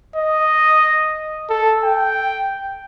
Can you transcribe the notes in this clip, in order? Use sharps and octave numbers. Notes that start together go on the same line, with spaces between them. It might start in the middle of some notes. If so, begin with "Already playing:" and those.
D#5
A4
G5